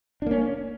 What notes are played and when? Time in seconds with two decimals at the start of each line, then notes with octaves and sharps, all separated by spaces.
0.22 D4
0.26 A#3
0.31 C#4